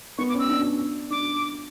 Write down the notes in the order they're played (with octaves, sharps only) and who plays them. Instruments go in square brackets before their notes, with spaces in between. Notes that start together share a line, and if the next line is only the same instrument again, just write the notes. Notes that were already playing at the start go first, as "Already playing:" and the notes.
[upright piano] B3 [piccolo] C#6
[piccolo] D6
[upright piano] C#4
[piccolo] E6
[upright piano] D4
[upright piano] D4 [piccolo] D6